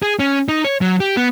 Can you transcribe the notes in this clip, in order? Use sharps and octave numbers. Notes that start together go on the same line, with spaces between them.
G#4
C#4
D#4
C#5
F#3
G4
B3